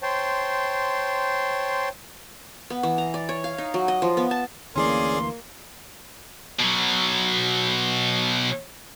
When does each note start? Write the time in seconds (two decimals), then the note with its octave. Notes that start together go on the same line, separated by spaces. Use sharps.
0.02 C5 C#5 G5 A5 C6
2.70 B3
2.83 E3
2.98 A#5
3.14 D5
3.29 C#5
3.44 F5
3.58 D#4
3.74 F#3
3.88 D#5
4.02 F3
4.17 B3
4.31 A5
4.76 D2 E3 A#3 C#4 G#4 D5 C6
6.60 B2 F#3